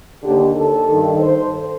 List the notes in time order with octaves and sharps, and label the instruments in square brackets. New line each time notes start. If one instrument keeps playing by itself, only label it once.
[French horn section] D#2 D3 G4
A4
G2 D#3
C5